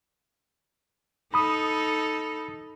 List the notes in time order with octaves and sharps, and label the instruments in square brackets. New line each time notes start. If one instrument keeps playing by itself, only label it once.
[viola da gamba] D#4 A4 [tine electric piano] B5 D#6